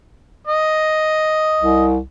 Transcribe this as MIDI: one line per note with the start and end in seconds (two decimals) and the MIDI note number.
0.47 1.85 75
1.57 2.02 36